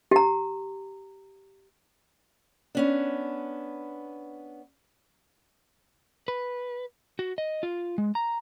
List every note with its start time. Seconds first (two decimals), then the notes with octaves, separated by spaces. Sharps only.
0.11 G4 A#5
2.75 B3 C#4 D4
6.28 B4
7.19 F#4
7.38 D#5
7.63 F4
7.98 G#3
8.15 A#5